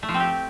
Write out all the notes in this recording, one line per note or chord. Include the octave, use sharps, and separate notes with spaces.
A3
F3
C4
G4